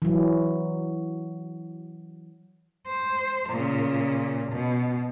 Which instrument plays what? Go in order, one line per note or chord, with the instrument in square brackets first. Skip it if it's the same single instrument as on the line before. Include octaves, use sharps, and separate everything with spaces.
[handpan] E3 F#3
[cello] C5
A#2 C#3
B2